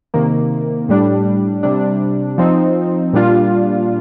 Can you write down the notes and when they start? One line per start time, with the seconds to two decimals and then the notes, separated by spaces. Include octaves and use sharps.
0.14 C3 D#3 A#3
0.89 A2 G3 D4
1.63 C3 G3 D4
2.38 F3 C4 D#4
3.13 A#2 G3 D4 F4